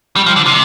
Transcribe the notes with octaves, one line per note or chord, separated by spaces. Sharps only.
G3
F3
D3
C3